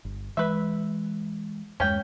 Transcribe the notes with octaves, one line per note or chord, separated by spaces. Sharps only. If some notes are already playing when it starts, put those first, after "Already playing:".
G1
E3 G#3 B4 E5
E2 G2 G#3 C#4 G5